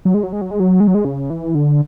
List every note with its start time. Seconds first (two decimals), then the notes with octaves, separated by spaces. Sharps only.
0.05 F#3
0.14 G#3
0.23 F#3
0.33 G#3
0.41 F#3
0.51 G#3
0.60 F#3
0.80 G#3
0.87 F#3
0.94 G#3
1.05 C#3
1.30 E3
1.55 D3